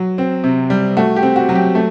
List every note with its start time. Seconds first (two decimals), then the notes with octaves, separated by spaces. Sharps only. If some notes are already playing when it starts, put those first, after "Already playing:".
Already playing: F#3
0.18 C4
0.44 C3
0.70 G3
0.97 A3 F#4
1.16 G4
1.23 C4
1.36 F#4
1.49 F#3
1.55 G4
1.75 A3